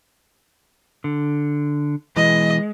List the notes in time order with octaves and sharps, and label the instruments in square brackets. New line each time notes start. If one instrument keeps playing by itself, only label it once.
[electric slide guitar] D3
[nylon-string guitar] B2 E3 [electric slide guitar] G#3 [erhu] D#5